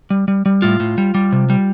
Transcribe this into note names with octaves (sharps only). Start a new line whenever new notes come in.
G3
G3
G3
A2 F4
A2
G3
G3
C3
G3